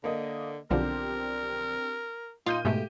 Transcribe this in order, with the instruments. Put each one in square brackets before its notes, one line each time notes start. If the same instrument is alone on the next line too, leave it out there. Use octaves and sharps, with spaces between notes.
[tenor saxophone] D3 [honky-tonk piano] A#3 D#5
[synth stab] B1 D3 F3 [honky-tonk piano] C4 D4 G4 [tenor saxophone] A#4
[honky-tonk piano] A#2 G6 D#7 [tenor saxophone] D#4 [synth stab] F4
[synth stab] G#2 B2 A3 [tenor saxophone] G4